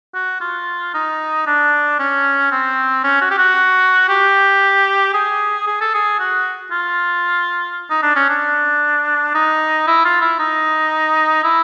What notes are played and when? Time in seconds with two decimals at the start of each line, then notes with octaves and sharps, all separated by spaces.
0.15 F#4
0.41 F4
0.94 D#4
1.46 D4
1.99 C#4
2.51 C4
3.04 C#4
3.21 F#4
3.31 G4
3.38 F#4
4.09 G4
5.13 G#4
5.67 G#4
5.81 A4
5.94 G#4
6.19 F#4
6.71 F4
7.90 D#4
8.02 D4
8.16 C#4
8.29 D4
9.34 D#4
9.87 E4
10.04 F4
10.22 E4
10.39 D#4
11.44 E4